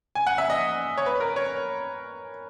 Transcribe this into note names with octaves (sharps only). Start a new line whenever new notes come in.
G#5
F#5
E5
D#5
C#5
B4
A#4
C#5